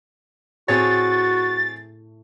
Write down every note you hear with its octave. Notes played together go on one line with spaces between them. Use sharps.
A2 C4 F#4 G#4 C#5 A6